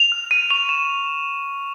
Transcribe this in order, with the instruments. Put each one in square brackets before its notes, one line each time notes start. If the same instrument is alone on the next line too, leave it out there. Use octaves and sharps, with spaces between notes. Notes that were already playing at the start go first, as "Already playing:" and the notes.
Already playing: [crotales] F7
F6
F6 D#7
C#6 F7
C#6 E7